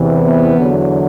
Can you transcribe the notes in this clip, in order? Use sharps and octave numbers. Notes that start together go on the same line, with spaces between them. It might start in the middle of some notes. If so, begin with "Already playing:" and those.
Already playing: E2 C3 E3
B3
E2 D3 F#3